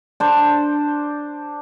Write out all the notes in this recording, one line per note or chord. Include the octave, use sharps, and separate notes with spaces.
D4 C5